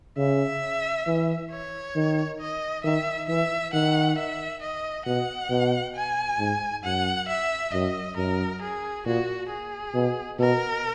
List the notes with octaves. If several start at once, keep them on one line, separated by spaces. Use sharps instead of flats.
C#3 E5
E3
C#5
D#3
D#5
D#3 E5
E3 E5
D#3 F#5
E5
D#5
B2 F#5
B2
G#5
G#2
F#2 F#5
E5
F#2 D#5
F#2 A#4
G#4
A#2 F#4
G#4
B2
B2 A#4